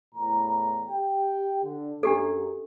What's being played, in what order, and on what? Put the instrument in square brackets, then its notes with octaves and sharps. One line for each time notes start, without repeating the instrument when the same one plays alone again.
[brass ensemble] E2 A2 A#5
G4 G5
D3
[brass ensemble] F#2 [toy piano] D4 G4 A4